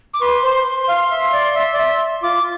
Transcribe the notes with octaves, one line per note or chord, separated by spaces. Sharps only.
D6
B4 C6
C5
F5
E5
D5
E5
D5
E5
F4 D6